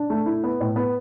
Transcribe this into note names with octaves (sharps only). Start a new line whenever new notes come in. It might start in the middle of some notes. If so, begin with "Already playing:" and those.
Already playing: D4
A3
E4
B3
A2
B3